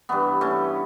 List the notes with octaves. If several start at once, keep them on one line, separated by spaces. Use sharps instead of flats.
G2 E3 B3
A3 C#4